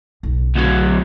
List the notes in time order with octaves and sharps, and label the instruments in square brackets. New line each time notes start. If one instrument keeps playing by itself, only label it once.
[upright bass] B1 C#3
[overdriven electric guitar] D2 F#3